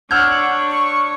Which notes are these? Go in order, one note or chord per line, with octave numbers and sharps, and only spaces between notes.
D4 C#5 F#5 E6 F6 G6 G#6
C#6